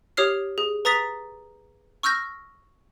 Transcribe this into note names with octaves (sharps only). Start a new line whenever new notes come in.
G4 C#5 D#6 F6 C7
G#4
B4 A#5 D#6 A6 B6
C#6 E6 F6 G6 A#6